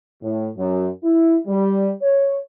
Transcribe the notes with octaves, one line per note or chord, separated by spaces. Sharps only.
A2
F#2
E4
G3
C#5